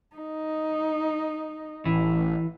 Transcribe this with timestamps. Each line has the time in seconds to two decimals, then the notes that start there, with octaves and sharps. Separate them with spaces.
0.16 D#4
1.85 A1 E3